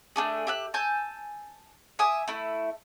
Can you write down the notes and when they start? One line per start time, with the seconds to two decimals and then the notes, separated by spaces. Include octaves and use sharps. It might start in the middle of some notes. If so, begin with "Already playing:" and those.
0.16 A3 D4 G#4
0.47 G4 E5 F#6
0.74 G#5 A5 E6 G6
1.99 E5 G#5 D6 D#6
2.28 A3 E4